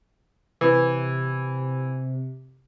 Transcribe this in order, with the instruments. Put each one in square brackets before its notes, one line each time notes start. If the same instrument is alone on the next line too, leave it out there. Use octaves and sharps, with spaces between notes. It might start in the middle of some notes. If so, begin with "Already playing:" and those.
[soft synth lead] C3 [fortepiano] E3